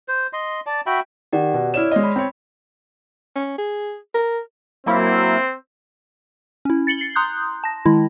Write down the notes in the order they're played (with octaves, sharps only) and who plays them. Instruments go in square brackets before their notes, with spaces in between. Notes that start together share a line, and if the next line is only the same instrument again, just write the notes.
[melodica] C5
D#5 C6
D5 A5
F#4 E5 G5 B5
[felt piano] D#3 [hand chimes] G4 D5 F#5
[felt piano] B2
[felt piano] E4 E7 [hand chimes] C#5 D5 F6
[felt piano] G#3 D#5
[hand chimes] B5
[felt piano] C4 C#5
[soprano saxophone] C#4
G#4
A#4
[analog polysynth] F#3 A#3 E4 [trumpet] C4
[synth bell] C#4 E4
A6 C#7 F#7 G7
C7
A#5 C6 D#6 F#6 G6
A5 A#6
D#3 G#3 E4